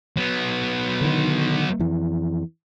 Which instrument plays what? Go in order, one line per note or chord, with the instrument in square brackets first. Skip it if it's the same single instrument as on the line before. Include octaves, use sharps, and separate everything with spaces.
[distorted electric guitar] F#3 B3
[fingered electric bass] D3 D#3
F2 E3